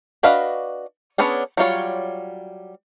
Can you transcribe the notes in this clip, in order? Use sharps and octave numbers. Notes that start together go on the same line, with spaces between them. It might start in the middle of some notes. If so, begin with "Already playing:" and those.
D4 F#4 B4 D#5 F5
B3 C#4 D4 G#4
F#3 G3 F4 C#5